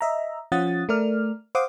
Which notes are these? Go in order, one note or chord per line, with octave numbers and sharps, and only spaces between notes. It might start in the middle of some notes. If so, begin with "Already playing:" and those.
D#5 E5 A#5
F3 C#4 F4 F#5 D#6 A6
A3 A#4 D5 F6
C5 F5 F#5 C6 D6 D#6